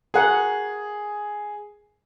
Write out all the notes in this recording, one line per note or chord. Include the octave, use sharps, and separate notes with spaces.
G#4 A#4 F#5